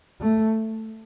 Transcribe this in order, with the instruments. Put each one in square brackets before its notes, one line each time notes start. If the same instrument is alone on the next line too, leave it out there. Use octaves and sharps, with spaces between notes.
[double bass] A3